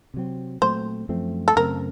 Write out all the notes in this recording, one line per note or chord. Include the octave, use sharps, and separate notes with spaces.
C3 F#3 C4
A#2 F#3 A3 C4 C5
F#2 F3 A3 C4
A4
F#2 C#3 A3 C4 A#4